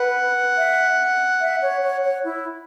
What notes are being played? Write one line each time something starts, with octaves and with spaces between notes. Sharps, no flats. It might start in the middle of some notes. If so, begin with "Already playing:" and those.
Already playing: B4 F#5
E5
E5
C#5
C#5
C#5
E4